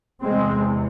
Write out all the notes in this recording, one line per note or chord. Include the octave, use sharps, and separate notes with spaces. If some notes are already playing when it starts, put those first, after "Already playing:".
E2 C3 G#3 C4